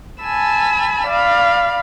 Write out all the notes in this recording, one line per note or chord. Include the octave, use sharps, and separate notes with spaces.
G#5 A5 B5 E6
D5 F5 B5